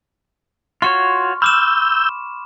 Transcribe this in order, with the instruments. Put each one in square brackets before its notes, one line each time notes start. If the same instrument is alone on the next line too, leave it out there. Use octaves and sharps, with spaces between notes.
[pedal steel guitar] F4 F#4 C#5 [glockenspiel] C6 C#6 F6
[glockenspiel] B5 D6 E7 [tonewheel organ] E6 G6 [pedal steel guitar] F6